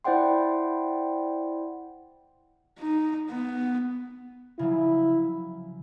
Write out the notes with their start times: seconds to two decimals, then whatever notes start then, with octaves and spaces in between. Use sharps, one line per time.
0.04 E4 C5 D5 F#5 G5 C6
2.80 D#4
3.30 B3
4.59 C#3 F3 F#3 E4